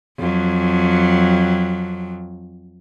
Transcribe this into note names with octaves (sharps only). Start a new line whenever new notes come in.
F2 F#3